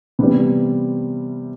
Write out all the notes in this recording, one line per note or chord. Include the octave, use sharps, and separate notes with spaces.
C3 E3 G3 B3 B4